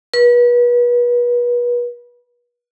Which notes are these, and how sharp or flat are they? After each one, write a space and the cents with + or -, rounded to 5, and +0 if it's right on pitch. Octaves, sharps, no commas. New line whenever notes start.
B4 -35